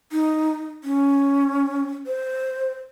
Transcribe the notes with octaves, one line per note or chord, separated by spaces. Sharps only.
D#4
C#4
C5